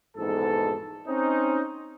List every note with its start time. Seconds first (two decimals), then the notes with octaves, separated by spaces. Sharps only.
0.17 A#1 E2 G#2 B2 A4
1.08 C4 C#4 D#4